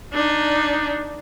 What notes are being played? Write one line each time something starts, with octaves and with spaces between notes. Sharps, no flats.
D4 D#4